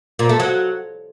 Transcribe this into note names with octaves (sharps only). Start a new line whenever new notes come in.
A#2
A3
F#3